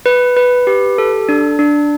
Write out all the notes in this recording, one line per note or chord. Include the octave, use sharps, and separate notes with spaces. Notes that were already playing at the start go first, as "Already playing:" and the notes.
B4
B4
G4
A4
D4
D4